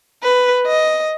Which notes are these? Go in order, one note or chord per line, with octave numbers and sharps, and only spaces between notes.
B4
D#5